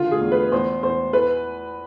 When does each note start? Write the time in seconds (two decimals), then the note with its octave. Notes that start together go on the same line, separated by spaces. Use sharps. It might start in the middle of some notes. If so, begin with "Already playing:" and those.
Already playing: D3 E3 F4
0.11 G#4
0.21 E2
0.32 B4
0.52 E2 C5
0.83 E2 C5
1.13 E3 B4